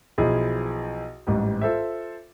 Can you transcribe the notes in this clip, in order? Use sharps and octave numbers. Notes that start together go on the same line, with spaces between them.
B1 F3 E4 G#4
A1 G#2 G3
F4 A4 C5 E5